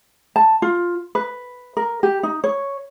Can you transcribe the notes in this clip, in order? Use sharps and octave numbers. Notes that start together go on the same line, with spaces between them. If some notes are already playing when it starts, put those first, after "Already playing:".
A5
F4
B4
A#4
G4
D#4
C#5